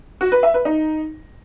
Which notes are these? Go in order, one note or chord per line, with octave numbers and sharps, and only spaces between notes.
F#4
B4
E5
B4
D#4